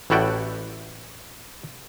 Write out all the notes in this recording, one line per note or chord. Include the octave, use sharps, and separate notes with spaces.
A1 A2 E4 F#4 D5 G5